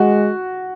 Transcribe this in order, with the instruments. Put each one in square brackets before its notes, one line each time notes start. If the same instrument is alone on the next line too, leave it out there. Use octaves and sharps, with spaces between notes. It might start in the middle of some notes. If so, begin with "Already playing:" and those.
Already playing: [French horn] G#3 [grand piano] F#4